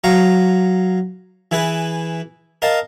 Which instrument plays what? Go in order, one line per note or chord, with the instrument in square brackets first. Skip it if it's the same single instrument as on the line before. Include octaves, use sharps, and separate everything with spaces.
[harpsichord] F#3 F5 A#5 C#6
E3 E4 G#4 B4
A#4 D#5 F5 A5